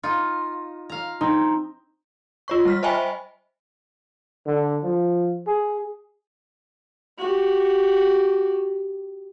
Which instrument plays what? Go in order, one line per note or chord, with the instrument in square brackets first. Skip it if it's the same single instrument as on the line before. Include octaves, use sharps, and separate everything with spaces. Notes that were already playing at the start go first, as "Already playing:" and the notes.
[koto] D#4 F4
F5 A#5
[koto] C4 [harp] D#4
[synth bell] F4 C#5 C#6
G3 F6 B6
C5 D#5 E5 G5 G#5 B5
[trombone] D3
F3
G#4
[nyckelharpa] F#4 G4